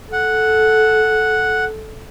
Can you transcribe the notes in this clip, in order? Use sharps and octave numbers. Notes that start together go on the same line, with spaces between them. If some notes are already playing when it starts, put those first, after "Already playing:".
A4 F#5